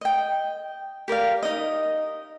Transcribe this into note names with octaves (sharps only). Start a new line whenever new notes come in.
D#5 G5
G4 A#4 D5 F5
D#4 D#5